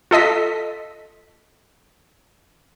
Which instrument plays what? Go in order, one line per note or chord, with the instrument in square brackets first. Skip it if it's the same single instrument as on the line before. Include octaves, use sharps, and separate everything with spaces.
[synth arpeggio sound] F4 A4 D#5 B6